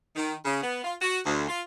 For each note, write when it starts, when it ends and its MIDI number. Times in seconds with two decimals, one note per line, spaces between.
0.16 0.34 51
0.45 0.61 49
0.62 0.80 59
0.84 0.95 65
1.01 1.19 66
1.25 1.47 38
1.48 1.61 65